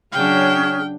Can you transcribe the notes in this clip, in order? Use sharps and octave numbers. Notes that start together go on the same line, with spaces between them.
C#3 F#3 C#4 D4 G#4 G5 F6